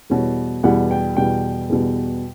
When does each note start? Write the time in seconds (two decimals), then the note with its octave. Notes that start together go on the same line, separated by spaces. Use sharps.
0.10 E2 B2 G3 C#5
0.63 E2 B2 G3 F#5
0.91 G5
1.17 E2 B2 G3 G5
1.69 E2 B2 G3